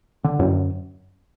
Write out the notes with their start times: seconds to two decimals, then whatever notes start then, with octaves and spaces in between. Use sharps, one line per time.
0.24 D3
0.39 F#2